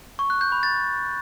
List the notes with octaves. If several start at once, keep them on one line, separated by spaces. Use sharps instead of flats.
C#6
F#6
G6
B5
A6